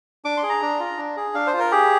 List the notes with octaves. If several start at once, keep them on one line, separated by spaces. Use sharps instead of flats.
D4 D6
C6
G#4
A#5
D4
F4
D4
G#4
D4 F5
C5
F4
A#4
G4 G#4